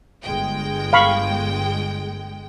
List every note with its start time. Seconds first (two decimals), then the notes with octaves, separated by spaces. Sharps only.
0.23 G1 G#3 G5
0.93 F5 B5 C#6